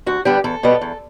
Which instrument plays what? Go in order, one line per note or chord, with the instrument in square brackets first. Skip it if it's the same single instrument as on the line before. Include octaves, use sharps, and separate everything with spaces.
[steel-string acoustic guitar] D2 F#4
D3 G3 B3 D4 G4
E2 A4
B2 G3 B3
E2